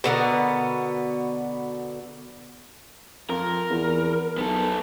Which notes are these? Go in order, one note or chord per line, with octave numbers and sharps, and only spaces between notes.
B2 D3 B3 A#4
F2 A#4
E2
B1 B3 A4